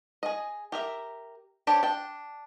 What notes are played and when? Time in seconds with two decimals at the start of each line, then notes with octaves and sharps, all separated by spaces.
0.23 G#4 D#5
0.72 G4 A#4 E5
1.67 D4 G4 A4 C5 C#5
1.83 D4 G5